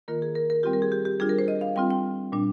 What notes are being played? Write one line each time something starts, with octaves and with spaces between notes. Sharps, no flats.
D#3 A#3 F4 A#4
G#4
A#4
A#4
G3 C4 F4 G4
A#4
G#4
G4
G4
G3 D4 F4 G#4
A#4
C5
D#5
F5
G3 C4 F4 G5
G5
A#2 G3 D4